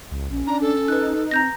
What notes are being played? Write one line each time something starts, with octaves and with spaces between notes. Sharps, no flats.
C#2
A#1 C#4
D4 A#5
A4
D#4 B4 F#6
C4 A#5 G6 A#6